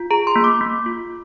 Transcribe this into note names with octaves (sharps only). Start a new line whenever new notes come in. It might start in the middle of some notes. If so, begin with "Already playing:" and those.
Already playing: F4
G#4 A#5
C6
A#3
D6
A#3
F4